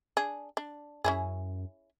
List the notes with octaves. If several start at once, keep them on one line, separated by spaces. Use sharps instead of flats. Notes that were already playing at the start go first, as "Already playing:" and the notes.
D4 G#4
D4
F#2 C#4 E4 G#4